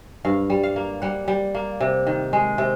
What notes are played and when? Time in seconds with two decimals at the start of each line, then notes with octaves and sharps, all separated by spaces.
0.25 G2 F5
0.50 G3
0.63 F5
0.76 A#3
1.02 G3 F#5
1.28 G3
1.54 A#3
1.80 C3
2.06 D#3
2.33 G#3
2.58 C3 G5